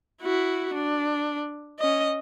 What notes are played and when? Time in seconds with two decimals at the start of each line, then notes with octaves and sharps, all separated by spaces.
0.22 E4 F#4
0.74 D4
1.80 C#4 D#5